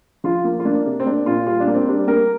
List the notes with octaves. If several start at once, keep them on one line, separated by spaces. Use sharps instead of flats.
F3 F4
A#3
F4
A#3 D4
C3
C4
A#3 D4
A#2 F4
G3 F4
D4
A#3
C4
G3 D4
A#3 A#4